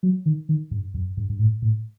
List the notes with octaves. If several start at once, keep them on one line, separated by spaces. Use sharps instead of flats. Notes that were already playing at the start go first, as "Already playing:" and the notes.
F#3
D#3
D#3
G2
F#2
G2
G2
A2
A2